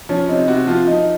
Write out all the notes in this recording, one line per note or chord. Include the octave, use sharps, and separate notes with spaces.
F3 C#4
C3 D#4
C3 F#4
F3 F4
F3 D#4